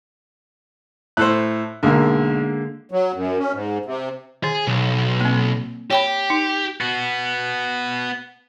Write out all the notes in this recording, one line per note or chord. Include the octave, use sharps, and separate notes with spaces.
A2 A4 C5 F#6
B1 D3 G#3 A#3 A#4
F#3
F#2
C#4
G#2
C3
D#3 G#4
B1
A#3 C4
G4 C#5 G5 B5
D#4
B3 F#4